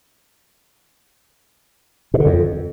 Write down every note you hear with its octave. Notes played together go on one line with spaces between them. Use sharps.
B2
D3
F2